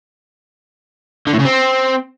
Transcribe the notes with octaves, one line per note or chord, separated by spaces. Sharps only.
D3
A2
C#3
C4